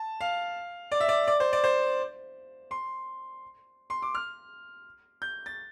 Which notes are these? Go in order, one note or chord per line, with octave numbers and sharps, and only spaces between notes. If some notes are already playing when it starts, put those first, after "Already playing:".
Already playing: A5
F5
D5
E5
D5
D5
C5
D5
C5
C6
C6
D6
F6
G6
A6